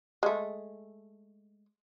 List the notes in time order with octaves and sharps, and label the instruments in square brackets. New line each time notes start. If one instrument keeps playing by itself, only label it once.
[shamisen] G#3 A3